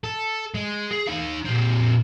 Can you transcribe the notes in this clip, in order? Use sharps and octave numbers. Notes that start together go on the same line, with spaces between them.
A4
G#3
G#4
D#4 F5
A#2 C4